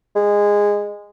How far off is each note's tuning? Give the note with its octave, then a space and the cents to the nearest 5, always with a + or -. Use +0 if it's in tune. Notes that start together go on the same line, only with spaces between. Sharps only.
G#3 -15